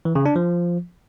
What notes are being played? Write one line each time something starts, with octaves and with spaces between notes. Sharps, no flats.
E3
C#3
D4
F3